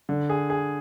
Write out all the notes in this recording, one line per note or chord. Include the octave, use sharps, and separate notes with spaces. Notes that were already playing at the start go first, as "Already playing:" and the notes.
D3
G#4
G#4